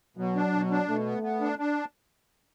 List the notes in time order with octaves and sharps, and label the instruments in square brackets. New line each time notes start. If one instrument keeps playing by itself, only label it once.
[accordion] B2 [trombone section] F#3
[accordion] D4
B2
D4
[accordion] B2 [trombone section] A3
[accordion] B3
B3
D4
D4